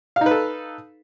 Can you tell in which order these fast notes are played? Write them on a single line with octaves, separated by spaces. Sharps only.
F5 D#4 B4 A4